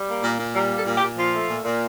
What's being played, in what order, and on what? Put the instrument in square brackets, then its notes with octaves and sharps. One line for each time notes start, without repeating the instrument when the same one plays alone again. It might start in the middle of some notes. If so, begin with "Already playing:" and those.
Already playing: [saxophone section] G3
A#3
A#2
A#2
G3 A#4
A#3 A4
A#2
G4
A#2
F3 F4
A3
A#2
A#2